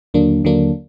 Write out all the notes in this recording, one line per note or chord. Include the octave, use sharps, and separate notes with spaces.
D#2 D3 F#3 A#3 D4
D#2 D3 F#3 A#3 D4